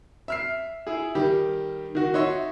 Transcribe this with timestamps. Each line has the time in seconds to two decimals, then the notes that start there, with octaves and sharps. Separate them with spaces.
0.28 E5 F6 C7
0.87 E4 G#4
1.15 D#3 G3 G4
1.95 D#3 F#4
2.14 D#4 F#4 C#5 E5 C6